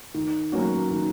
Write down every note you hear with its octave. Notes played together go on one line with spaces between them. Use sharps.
D#3
F#3 A#3 C#4 F#4
D#3